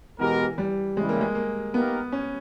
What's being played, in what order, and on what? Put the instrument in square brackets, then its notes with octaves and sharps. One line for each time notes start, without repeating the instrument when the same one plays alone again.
[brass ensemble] B2 G#3 B3 G4 A#4 [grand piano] E3
[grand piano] G3
[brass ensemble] C#3 E3 G3 [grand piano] G#3
[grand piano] A#3
G#3
A#3
[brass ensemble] A#3 D#4 G4 A#4 [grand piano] B3
[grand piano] C#4